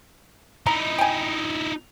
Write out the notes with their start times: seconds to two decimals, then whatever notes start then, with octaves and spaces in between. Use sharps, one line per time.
0.67 D#4 E4 A#5
0.98 G5 G#5